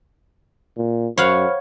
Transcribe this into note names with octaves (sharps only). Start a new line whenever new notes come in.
A#2
F#2 C5 C#5 F5 F#5 B5 F6